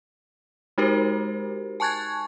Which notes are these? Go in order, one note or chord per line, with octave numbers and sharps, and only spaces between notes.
G#3 D#4 F#4 G4 A#4 C5
G#5 A5 C#6 F#6 G#6 A6